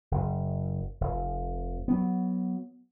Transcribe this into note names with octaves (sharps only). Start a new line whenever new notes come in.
F#1
F1
F#3 B3